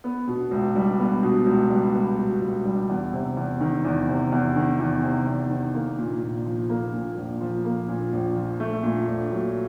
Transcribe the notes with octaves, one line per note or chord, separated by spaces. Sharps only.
B3
B2
C#2
G3
B3
B2
C#2
G3
B3
B2
C#2
G3
E2
C3
E2
D#3
E2
C3
E2
D#3
E2
C3
E2
D#3
A#3
A#2
A#1
F3
A#3
A#2
A#1
F3
A#3
A#2
A#1
F3
A3
A#2
A#1
F#3